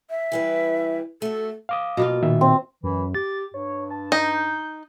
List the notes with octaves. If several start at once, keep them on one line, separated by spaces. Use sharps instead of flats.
E5
E3 G3 B4
A3 F#4 A4
F5 D6 D#6
B2 A#3 F4
A#2 D#3 E5
C4
F#2 E3
G4 A6
G2 C#5
A5
D#4 G6